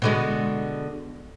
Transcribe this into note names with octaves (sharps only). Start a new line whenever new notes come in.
B2 D3 G#3